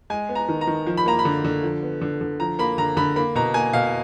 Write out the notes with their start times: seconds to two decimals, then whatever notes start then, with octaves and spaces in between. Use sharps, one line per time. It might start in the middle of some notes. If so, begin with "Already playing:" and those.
0.10 G#3 G#5
0.29 B3
0.35 A#5
0.49 D#3
0.61 A#5
0.67 D#3
0.86 F3
0.97 B5
1.06 A#3 A#5
1.19 B5
1.25 D3
1.45 D3
1.63 F3
1.83 B3
2.02 D3
2.21 D3
2.40 F3 A#5
2.59 A#3 B5
2.78 D3 A#5
2.97 D3 B5
3.16 A#3 B5
3.35 B2 A#5
3.54 A#3 G#5
3.73 B2 F5